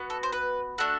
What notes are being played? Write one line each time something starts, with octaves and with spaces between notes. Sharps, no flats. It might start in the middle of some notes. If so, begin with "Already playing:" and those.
Already playing: B3 F#4
A4
C5
B4
A3 D4 F#4 A4